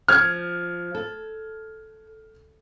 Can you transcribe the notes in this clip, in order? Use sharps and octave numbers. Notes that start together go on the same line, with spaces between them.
F3 F6 G#6
A4